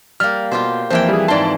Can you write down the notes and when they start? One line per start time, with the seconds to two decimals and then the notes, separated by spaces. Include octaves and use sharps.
0.20 G3 A#3 F6
0.51 B2 F4 G4 C5
0.90 F2 E3 A#3 C5 G5
1.09 G3 G#4
1.28 G#2 D5 A5 C6